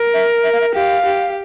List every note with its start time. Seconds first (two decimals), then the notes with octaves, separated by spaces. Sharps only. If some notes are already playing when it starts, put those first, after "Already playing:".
Already playing: A#4
0.14 E5
0.44 E5
0.53 F5
0.61 E5
0.75 G4 F5
1.05 G4